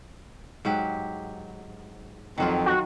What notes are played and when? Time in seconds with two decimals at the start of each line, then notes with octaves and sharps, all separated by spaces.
0.65 G#2 F#3 G4
2.38 F2 D#3 F#3 F4
2.66 F#4